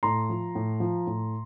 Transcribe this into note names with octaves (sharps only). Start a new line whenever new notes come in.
A2 A#5 C6
F3
A2
F3
A2